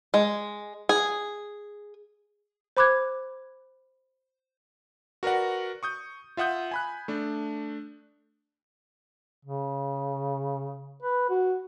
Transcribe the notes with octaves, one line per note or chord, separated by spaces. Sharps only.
G#3
G#4
C5 B5 D6 F#6 G#6
F#4 A#4 B4 D5 F#5
C#6 D#6 G6
F4 E5 F#5 D#6 G6
G#5 B5 F#6
A3 D4
C#3
B4
F#4